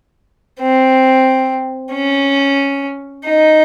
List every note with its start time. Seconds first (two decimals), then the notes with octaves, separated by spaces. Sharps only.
0.60 C4
1.93 C#4
3.26 D#4